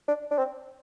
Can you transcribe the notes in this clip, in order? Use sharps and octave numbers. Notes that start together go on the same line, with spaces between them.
D4
D4
C4